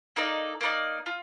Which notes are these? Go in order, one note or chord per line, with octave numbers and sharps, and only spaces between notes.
A#3 D#4 A4 D5
A#3 D#4 A4 D5
F4